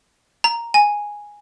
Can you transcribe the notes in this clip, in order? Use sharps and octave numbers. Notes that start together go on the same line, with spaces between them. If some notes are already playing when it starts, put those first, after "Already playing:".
A#5
G#5